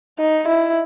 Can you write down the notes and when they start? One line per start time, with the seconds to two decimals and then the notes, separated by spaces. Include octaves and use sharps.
0.19 D#4
0.48 E4